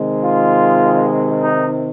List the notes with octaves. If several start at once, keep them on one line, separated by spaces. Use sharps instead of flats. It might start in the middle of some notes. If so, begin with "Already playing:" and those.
Already playing: C3 D#3 G#3
F4
D#4